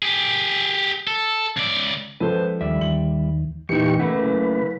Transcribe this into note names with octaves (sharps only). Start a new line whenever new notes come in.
G4 G#4
A4
C#2 D5
C#2 F3 A4 B4 C5
D#2 G3 D5 E5
D#2 F#7
E2 A#2 E3 D#4 G4 C#6
C#3 A3 A#3 B4 F#5
F#1